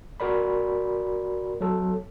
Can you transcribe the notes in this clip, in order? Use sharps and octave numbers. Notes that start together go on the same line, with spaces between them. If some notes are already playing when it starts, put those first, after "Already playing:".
F#4 A#4 D5 B5
F#3 A4